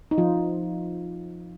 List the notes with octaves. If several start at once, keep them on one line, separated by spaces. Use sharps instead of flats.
D#4
F3 F4